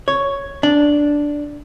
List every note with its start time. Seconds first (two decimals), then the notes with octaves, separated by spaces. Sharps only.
0.08 C#5
0.63 D4